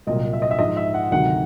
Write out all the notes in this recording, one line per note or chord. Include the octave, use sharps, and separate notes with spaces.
C2 A#2 F#3 D#5
E5
D#5
E5
G#2 F3 D#5
E5
F#5
D2 C3 D#3 F#3 F#5